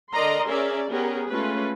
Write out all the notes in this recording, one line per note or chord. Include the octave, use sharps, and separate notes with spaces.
D3 A#4 D5 D#5 A#5 C6
C#4 G#4 A#4 D5 E5
B3 C#4 G4 G#4 A#4
G#3 A3 C#4 F4 B4